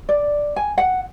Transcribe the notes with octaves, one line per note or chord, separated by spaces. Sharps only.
D5
G#5
F#5